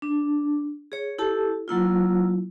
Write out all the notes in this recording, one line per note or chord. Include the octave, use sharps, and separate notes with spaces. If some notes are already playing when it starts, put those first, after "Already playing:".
D4
G#4 C#5
E4 G4 A4 A5
F#3 A#3 E4 F4